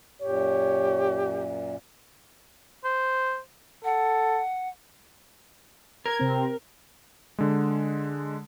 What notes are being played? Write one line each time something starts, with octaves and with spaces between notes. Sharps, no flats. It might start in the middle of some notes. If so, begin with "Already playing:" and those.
F#2 A#2 G4 C#5
C5
A4 F#5
A#4 G#6
C3 C4
D3 G#3